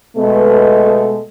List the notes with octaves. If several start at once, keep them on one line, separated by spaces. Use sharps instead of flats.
B2 G#3 A3 B3 A4